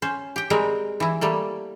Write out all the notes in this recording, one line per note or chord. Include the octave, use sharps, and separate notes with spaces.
C#4 C5
G4 G5
G3 G#3 C4 A#4
E3 E4
G3 A3 A#3